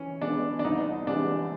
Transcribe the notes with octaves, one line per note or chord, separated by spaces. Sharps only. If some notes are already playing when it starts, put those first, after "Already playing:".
Already playing: E3 C#4
G#3 B3 D4
D4
C2 D#4
C3 E3 G#3 D4